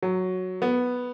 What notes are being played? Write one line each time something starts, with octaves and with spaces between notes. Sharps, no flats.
F#3
B3